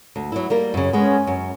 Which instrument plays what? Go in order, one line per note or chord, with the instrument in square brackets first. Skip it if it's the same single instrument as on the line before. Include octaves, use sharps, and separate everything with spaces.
[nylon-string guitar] D2
F#3 B3 E4
G3 A#3 A#4
[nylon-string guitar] F#2 C#3 [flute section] C#4
[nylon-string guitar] G#3 B3
F#2